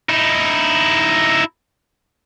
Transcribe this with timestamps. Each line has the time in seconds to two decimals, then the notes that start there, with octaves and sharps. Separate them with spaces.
0.09 D#4 E4